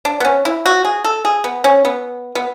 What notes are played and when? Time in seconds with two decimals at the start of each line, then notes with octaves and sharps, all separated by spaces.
0.05 D4
0.20 B3
0.25 C#4
0.45 E4
0.66 F#4
0.85 G#4
1.04 A4
1.25 G#4
1.44 B3
1.64 C#4
1.85 B3
2.35 B3